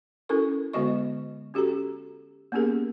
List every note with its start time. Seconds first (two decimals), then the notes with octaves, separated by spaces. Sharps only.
0.29 C#4 E4 F#4 A4 A#4 C#6
0.73 D3 G#3 B3 F#4 D#5 C#6
1.54 C#4 F#4 G4 A4 A#5
2.52 A#3 B3 C#4 G4 G#4 A#4